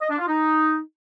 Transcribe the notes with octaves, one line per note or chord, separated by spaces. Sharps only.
D#5
D4
F4
D#4